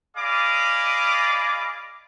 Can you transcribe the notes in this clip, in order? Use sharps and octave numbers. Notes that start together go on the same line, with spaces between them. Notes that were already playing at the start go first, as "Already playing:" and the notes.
G#4 D5 D#5 F5 B5 D6